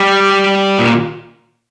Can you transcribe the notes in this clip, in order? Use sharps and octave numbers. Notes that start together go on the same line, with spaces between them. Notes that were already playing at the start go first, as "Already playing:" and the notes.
Already playing: G3
A#2